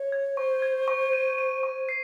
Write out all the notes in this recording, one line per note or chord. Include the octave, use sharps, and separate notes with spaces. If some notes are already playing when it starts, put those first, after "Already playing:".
Already playing: C#5
G#6
C5 C#6
G#6
C#6
D#7
D#7
C#6
C7